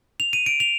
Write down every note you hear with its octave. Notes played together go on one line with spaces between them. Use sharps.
F7
D#7
D7
F7